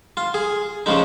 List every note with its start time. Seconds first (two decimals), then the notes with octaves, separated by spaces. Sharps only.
0.17 F4
0.34 G#4
0.86 C#3 F3 G#3 D#4